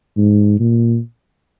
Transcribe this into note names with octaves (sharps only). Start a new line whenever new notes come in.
G#2
A#2